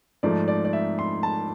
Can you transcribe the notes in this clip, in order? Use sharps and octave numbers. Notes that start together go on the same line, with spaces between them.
G#2 F3 A3 D5
D5
D5
E5
C6
A5